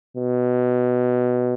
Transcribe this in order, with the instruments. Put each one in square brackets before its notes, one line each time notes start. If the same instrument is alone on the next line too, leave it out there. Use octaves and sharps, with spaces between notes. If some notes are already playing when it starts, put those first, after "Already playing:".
[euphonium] B2